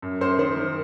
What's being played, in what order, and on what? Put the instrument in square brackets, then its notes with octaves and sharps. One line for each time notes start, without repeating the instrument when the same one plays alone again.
[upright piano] F#2
F#2 C5
D#3 C5
D#3 A#4